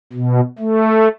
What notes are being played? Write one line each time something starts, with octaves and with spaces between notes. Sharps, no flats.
B2
A3